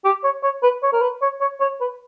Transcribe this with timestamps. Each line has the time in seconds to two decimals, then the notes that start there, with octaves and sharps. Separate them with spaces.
0.05 G4
0.24 C#5
0.43 C#5
0.63 B4
0.83 C#5
0.93 A#4
1.02 B4
1.22 C#5
1.41 C#5
1.61 C#5
1.81 B4